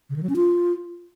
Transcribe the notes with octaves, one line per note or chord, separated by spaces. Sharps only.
C#3
D#3
F#3
C#4
F4